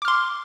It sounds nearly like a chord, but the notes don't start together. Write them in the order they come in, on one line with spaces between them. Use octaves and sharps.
D6 F6 C6